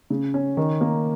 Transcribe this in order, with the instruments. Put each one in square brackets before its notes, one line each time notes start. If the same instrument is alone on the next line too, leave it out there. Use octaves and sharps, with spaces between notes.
[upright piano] C#3
C#4
D#3
A#3